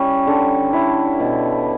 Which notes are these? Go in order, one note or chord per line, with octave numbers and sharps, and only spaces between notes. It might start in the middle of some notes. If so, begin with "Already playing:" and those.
Already playing: G3 C#4 E4
D3
E4
B2